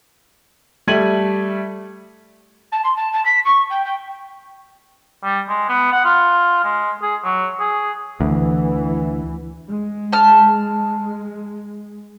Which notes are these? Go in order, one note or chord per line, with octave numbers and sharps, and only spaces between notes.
G3 A3 G#6 D#7 F#7
A5
C6
A5
A5
B6
C#6
G5
G5
G3
G#3
B3
F#5
F4
G#3
G#4
F#3
G#4
D2 E3
G#3
A5 F6